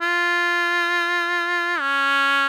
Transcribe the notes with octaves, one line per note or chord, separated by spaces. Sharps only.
F4
C#4